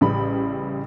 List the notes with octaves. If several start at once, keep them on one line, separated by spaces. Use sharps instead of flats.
A1 C#3 G3 B5